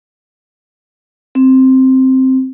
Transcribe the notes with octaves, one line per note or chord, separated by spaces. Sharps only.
C4